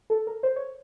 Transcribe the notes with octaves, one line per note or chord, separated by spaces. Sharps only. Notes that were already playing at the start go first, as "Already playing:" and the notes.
A4
A#4
C5
C#5